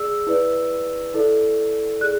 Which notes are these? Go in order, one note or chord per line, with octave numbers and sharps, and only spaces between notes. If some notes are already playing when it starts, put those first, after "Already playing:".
Already playing: G#4 D5 E6
E4 B4 D5
E4 A4 D5
G#4 D5 F#6